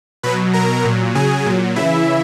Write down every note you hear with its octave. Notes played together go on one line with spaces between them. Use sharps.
B2 F#3 B4 B5
B2 F#3 A#4 A#5
A#2 F#3
C#3 F#3 G#4 G#5
A#2 F#3
C#3 E3 E4 E5